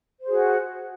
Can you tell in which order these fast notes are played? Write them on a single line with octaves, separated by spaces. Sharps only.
C5 G#4 F#4